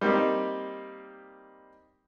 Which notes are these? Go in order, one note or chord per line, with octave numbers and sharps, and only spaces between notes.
G3 A#3 C4 D#4 G4